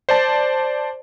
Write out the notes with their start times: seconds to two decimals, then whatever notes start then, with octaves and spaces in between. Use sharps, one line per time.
0.09 C5 D5 A5